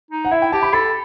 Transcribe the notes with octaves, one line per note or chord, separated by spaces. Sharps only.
D#4
F#5
E4 E5
G5
G4 A5
B5
A4 B5